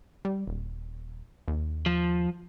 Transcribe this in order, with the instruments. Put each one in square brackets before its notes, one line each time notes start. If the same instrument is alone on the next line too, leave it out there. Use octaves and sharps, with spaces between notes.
[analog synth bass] G3
D#1
D#2
[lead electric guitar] F3